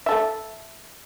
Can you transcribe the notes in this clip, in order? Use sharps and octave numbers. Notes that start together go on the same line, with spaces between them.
A4 E5